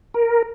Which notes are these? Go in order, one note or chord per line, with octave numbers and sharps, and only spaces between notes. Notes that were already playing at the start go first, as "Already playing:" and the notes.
A#4